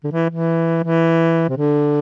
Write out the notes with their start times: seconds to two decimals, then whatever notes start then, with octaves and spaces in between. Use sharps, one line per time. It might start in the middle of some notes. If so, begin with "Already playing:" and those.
0.04 D3
0.12 E3
0.30 E3
0.84 E3
1.49 C3
1.57 D3